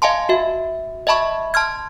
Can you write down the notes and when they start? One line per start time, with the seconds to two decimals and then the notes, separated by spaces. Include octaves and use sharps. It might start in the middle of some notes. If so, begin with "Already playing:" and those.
0.02 D#5 F5 G#5 A5 C6
0.29 F#4 E5
1.07 D#5 E5 A5 B5 C#6
1.54 A5 C6 F6 G#6